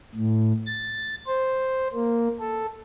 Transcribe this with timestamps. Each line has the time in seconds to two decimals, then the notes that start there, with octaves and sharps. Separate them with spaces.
0.15 A2
0.66 A6
1.27 C5
1.93 A#3
2.40 A4